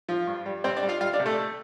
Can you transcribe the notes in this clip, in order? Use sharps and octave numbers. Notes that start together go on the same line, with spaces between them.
F3 F4
G2
G3
G3 C4 C5
D4 D5
G3
F4 F5
G3 F4 F5
D4 D5
C3
A3 A4
A3